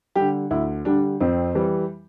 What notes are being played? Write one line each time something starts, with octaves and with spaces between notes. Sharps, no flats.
D3 G3 G4
D2 E4
D3 G3 D4
F2 C4
E3 G3